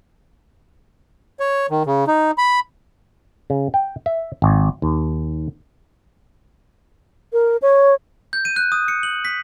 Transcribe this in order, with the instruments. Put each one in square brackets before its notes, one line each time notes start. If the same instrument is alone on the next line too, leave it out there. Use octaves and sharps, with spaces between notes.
[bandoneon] C#5
D#3
C#3
D#4
B5
[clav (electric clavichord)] C#3
G5
E5
G#1
D#2
[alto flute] A#4
C#5
[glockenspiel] G6
D#7
F#6
D#6
C#7
F#7
B6